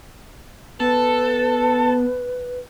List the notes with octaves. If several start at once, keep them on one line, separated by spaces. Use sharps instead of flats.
B3 A4 B4